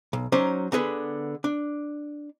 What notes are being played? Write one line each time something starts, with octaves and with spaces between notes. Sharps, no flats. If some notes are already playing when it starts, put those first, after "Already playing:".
B1
F#3 C#4 D#4 C5 D5
D3 B3 G#4 B4
D4